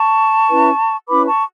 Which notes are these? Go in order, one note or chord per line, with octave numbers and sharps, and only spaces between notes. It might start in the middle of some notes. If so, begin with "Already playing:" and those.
Already playing: A5 C#6
C#4 E4 B4
C#4 E4 B4 B5 D6
A5 C#6